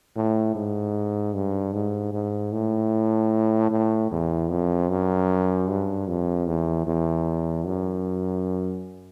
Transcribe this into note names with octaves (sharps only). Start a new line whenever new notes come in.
A2
G#2
G2
G#2
G#2
A2
A2
E2
F2
F#2
G2
F2
E2
E2
F#2